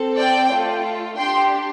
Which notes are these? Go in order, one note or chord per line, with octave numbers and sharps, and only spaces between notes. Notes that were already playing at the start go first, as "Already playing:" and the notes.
Already playing: C4 A4
D5 G5
A3 F4 A4
D4 G4 G5 C6